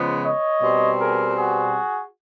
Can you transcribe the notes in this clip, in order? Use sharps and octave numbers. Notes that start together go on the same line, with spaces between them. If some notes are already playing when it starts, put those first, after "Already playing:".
Already playing: C#3 F3 G#3 B3
C#5 D#5
B2 G3 C4
G#4 A#4
F#4 G#4